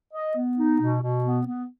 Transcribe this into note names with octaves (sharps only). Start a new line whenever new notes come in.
D#5
B3
D#4
B2
B2
B3
B3